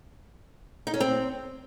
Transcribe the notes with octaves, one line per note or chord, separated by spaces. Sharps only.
D#4
C#4
C4